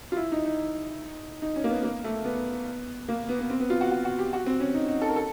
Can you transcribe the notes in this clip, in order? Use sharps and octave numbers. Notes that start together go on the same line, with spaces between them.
F4
E4
D#4
D#4
D#4
C#4
A#3
B3
A#3
A3
B3
A#3
B3
B3
C4
B3
F4
F#4
F#4
F#4
G4
F#4
C4
C#4
D#4
D#4
A4
A#4
A4